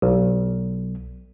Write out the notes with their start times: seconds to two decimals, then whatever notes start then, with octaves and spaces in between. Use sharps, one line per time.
0.02 B1